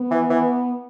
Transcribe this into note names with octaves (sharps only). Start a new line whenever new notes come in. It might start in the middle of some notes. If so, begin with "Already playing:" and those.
Already playing: B3
E3
E3